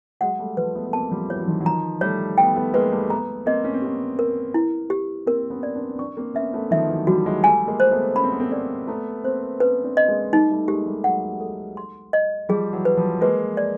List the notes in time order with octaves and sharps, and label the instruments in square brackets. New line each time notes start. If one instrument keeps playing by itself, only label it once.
[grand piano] F#3 G#3 [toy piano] F#5
[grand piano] G3 A3
[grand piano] F3 G3 [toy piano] B4
[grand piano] A3 B3
B3
[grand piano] A#3 C4 [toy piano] A5
[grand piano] F3 G3
[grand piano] E3 F#3 [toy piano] C#5
[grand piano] E3
D#3 F3
F#3
[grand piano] D#3 F3 [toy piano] A#5
[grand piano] G3 A3 [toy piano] C#5
[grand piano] A3 B3 [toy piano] G5
[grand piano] A3 B3
[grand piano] G#3 A#3 [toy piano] B4
[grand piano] G3 A3
[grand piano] A3 B3 [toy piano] A#5
[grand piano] A#3 C4 [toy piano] D#5
[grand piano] C#4
C4
[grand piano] B3 C#4 [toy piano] G4
[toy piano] A#4
E4
G4
[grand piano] A#3 C4 [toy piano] A#4
[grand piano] B3 C#4
[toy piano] D5
[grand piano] C4 D4
[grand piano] C4 D4 [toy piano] C#6
[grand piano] A#3 C4
[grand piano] B3 C#4 [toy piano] E5
[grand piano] A3 B3
[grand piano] D#3 F3 [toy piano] E5
[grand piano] E3 F#3
[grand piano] F3 G3 [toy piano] F#4
[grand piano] F#3 G#3
[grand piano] G3 A3 [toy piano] G#5
[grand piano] G#3 A#3
[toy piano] C5
[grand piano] A3 B3
[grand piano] C#4 [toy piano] B5
[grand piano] C4
B3
A#3 C4
[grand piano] A#3 C4 [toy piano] D5
[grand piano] A3 B3 [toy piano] A#5
[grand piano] A#3 C4 [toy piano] C5
[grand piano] B3 C#4 [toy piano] B4
[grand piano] C4 D4
[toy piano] D#5
[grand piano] G#3 A#3
[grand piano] G3 A3 [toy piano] D#4
[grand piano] G3 A3
[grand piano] G#3 A#3 [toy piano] G4
[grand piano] G3 A3
[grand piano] F#3 G#3 [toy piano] F#5
[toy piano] A4
C6
D#5
[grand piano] F3 G3 [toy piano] G#4
[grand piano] E3 F#3
[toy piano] B4
[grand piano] F3 G3
[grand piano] G#3 A#3 [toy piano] B4
[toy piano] D5